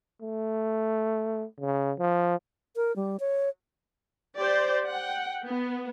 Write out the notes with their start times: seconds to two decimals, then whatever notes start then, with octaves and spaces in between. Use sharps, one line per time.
0.22 A3
1.60 C#3
1.99 F3
2.76 A#4
2.96 G3
3.20 C#5
4.38 G4 C5 D5
4.87 F#5 G5
5.46 B3